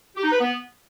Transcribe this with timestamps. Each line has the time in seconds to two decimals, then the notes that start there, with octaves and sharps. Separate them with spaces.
0.16 G4
0.23 D#4
0.31 B4
0.39 B3